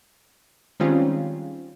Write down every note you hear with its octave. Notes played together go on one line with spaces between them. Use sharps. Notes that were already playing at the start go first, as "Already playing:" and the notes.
D#3 G3 G#3 C4 C#4 F4